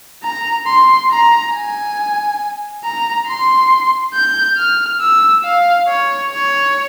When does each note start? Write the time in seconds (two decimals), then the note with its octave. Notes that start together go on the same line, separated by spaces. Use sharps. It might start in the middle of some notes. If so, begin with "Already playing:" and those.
0.24 A#5
0.66 C6
1.11 A#5
1.53 G#5
2.84 A#5
3.27 C6
4.14 G6
4.57 F6
5.00 E6
5.44 F5
5.88 C#5
6.30 C#5